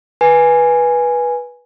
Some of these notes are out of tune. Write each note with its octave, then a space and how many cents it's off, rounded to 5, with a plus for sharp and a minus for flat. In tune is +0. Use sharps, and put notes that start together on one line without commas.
B4 -15 G#5 +0